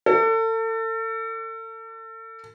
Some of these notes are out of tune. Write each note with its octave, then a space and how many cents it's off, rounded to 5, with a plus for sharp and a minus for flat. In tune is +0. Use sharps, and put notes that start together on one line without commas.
A4 +35